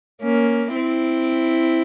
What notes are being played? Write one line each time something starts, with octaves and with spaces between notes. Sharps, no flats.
A#3 C#4
C4 E4